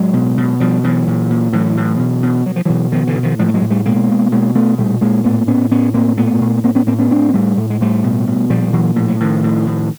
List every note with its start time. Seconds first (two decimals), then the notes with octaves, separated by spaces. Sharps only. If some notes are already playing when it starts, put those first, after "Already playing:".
Already playing: A2 F#3 G#3
0.13 B2
0.37 B2
0.60 B2 F3 G3
0.83 B2 E3 F#3
1.07 A#2
1.30 A#2
1.53 A2 E3 F#3
1.77 A2
1.99 B2
2.23 B2
2.46 B2 F#3
2.56 F3
2.65 B2 E3 F#3
2.92 B2 D#3 F3
3.07 D3 E3
3.15 B2
3.23 D#3 F3
3.39 A2 F3 G3
3.48 A3
3.54 F#3 G#3
3.62 A2
3.70 G3 A3
3.85 B2 G#3 A#3
4.09 B2
4.32 B2 G#3 A#3
4.55 B2 A3 B3
4.78 A#2 G3 A3
5.01 A#2 G#3 A#3
5.24 A2 A3 B3
5.47 A2 B3 C#4
5.71 A2 B3 C#4
5.94 A2 A#3 C4
6.17 A#2 A3 B3
6.41 A#2
6.64 A2 A#3 C4
6.75 B3 C#4
6.87 A2 A#3 C4
6.98 B3 C#4
7.10 A2 C4 D4
7.29 A#3
7.34 A2 G3 A3
7.57 A2 A3
7.70 G#3
7.80 A2 G3 A3
8.04 B2
8.27 B2
8.49 A#2 F3 G3
8.73 A#2 E3 F#3
8.96 A2 F3
9.08 F#3
9.20 A2 D#3 F3
9.44 A2
9.67 A2